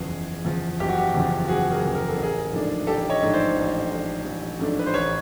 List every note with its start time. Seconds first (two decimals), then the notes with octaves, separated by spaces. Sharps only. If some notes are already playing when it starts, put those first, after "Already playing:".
Already playing: F#1 E2 C#3 F3 G#4
0.10 F#1
0.45 E2 C#3 F3
0.80 F#1 G4
0.89 F#4
0.98 G4
1.14 E2 C#3 F3
1.48 F#1 F#4 G#4
1.71 G#4 A#4
1.83 E2 C#3 F3
1.95 A#4
2.09 A4
2.18 A1
2.23 G#4 A#4
2.52 G#2 F3 A3 D4
2.87 A1 G4 A4
3.10 C#5 D#5
3.22 G#2 F3 A3 D4
3.33 C5 D5
3.56 A1
3.90 G#2 F3 A3 D4
4.25 A1
4.60 G#2 F3 A3 D4
4.79 B4
4.86 C5
4.94 A1 B4 C#5